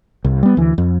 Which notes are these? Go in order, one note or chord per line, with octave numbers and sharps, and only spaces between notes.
C2
G3 B3
D2 E3
F2